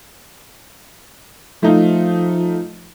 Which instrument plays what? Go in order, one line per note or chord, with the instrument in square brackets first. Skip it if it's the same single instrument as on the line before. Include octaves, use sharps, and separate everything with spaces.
[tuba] F3 [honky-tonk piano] A3 D#4 F4